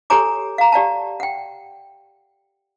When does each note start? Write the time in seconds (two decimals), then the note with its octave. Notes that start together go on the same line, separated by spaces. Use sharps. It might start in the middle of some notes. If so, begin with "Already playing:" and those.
0.10 G4 A4 C#5 G#5 A#5 D6
0.58 F5 A#5
0.72 G4 D5 F5 A5
1.20 F#5 G5